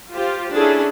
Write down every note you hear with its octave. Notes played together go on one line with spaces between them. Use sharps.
F4 G4 C5
C#4 D4 E4 G#4 A4